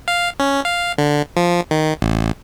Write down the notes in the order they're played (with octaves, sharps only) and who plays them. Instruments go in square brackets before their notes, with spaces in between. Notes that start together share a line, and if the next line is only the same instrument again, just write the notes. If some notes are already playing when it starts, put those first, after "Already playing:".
[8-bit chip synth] F5
C#4
F5
D3
F3
D#3
A1